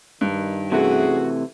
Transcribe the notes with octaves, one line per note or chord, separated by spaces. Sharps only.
G2 D#3
C3 E3 A3 C#4 F#4 G#4